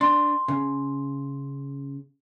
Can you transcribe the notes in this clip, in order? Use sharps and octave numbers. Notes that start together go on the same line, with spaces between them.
D4 C6
C#3